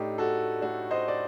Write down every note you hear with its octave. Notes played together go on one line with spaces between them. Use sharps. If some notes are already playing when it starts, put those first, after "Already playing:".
Already playing: A2 A3 D4 D#4 G4
F#4 A4
A2 A3 D4 F#4
C5 D#5
D5